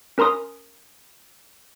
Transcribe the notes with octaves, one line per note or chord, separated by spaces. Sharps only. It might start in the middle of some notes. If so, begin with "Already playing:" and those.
C#4 A#4 A#5 C6 D#6